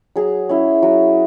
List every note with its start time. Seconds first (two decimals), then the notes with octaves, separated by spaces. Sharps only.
0.16 F#3 G#4
0.49 C#4 E4
0.83 F#3